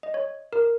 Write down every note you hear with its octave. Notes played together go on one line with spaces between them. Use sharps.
D#5
C#5
A#4